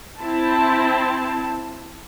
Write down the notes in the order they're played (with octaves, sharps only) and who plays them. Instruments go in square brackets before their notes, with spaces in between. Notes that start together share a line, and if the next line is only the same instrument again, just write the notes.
[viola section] C4 E4 A5